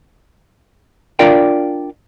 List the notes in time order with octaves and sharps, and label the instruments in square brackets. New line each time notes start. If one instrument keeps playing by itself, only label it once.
[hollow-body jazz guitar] D4 F4 A#4 D5 F5 G5